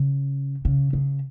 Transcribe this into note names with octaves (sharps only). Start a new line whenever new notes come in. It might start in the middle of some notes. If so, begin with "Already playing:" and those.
Already playing: C#3
C#3
C#3